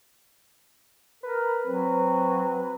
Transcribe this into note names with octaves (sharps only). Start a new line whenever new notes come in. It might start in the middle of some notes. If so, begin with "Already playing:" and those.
A#4 B4
F#3 C4